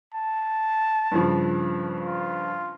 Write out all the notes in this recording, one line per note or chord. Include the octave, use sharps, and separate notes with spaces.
A5
G2 C#3 F3
F4